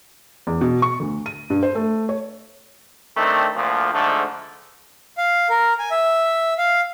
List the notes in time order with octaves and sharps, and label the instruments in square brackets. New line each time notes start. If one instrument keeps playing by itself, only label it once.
[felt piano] E2
B2
C#6
D2
D#7
G2
C5
A3
C#5
[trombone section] D#3 A3 C4 D4
D2 A#2 F3
G#2 D3 F3 A3
[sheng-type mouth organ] F5
A#4
G#5
E5
F5